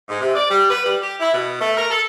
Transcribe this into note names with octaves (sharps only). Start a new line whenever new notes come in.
G#2
C3
D5
G3
B4
G3
G4
E4
B2
A3
A#4
A4